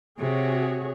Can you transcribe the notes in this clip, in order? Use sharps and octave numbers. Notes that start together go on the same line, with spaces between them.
C3 F#4 G#4 C#5